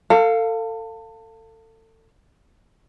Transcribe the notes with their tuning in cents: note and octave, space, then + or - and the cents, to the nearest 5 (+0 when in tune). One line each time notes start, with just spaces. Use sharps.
A4 +30 F5 +0